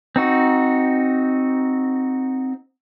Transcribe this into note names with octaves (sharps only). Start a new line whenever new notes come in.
C4 D#4 F#4